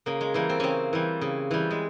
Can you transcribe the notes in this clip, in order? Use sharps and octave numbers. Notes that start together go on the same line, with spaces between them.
C#3 A#3
G#3
E3 G3 A#3
C4
C#3 C4 C#4
E3 G3
C#3
E3 G3
G#3